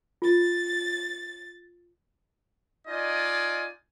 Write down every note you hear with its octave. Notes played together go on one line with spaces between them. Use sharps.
F4 A6
D#4 F4 D5 D#5 G#5